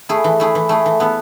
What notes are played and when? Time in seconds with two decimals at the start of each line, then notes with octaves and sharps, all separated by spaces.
0.09 A3 E4 G#4
0.24 E3
0.40 A3 E4 G#4
0.55 E3
0.69 A3 E4 G#4
0.86 E3
1.00 B3 E4 A4